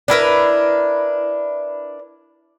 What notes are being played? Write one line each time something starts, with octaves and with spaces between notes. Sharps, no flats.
D4 E4 A#4 B4